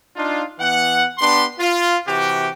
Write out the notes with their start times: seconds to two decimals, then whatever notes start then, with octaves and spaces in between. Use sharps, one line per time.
0.16 D4 D#4 F4
0.59 E3 B3 F#5
1.19 B3 D4 G4 C6
1.59 F4
2.07 C3 E3 F#4 G4